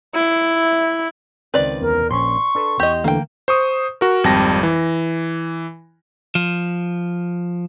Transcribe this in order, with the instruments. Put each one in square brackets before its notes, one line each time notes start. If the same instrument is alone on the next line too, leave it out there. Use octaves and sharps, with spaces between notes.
[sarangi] E4
[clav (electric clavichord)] C#2 D#3 C4 [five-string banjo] B4 D5
[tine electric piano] E2 [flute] A#4
[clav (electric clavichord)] A#1 C#4 [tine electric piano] C6 [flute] C#6
[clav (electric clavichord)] D4 A4 B4
[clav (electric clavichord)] E2 [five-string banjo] G4 D#5
[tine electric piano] D3 E3 A3 [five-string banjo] A#3 G5
[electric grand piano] C5 C#6 D#6
F#4 A#4
G#1 F2 G3 G5 A5 A#6
E3
[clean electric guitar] F3